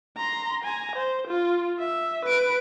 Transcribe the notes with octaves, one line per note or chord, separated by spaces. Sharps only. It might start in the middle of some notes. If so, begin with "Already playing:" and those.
A#5 C6
G#5 A#5
C5
F4
E5
B4 D7